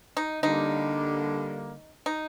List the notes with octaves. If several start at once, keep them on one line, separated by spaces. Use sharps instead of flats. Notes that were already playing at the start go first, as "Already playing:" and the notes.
D#4
D3 G3 A#3 D#4
D#4